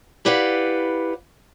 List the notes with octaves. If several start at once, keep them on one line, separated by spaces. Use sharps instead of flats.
E4 G4 B4 D5 F5 F#5